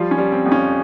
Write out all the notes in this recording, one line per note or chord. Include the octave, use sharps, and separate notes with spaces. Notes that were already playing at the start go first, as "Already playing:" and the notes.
Already playing: F3 G3 F4
C#4
G3
C4
F2
C#4